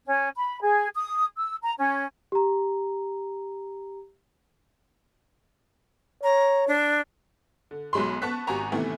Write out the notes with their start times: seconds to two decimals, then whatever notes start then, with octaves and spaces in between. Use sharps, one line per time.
0.06 C#4
0.35 B5
0.61 G#4
0.95 D#6
1.37 E6
1.62 A#5
1.77 C#4
2.32 G4 A#5
6.23 C#5 A#5
6.68 D4
7.71 D3
7.93 B1 F#3 G#3 B5 C6
8.22 B3 A5 C#6 F#6 B6
8.47 G#1 F#4 G4 G#5 A#5 C#6
8.72 A2 C3 D#3 E3 A3 B3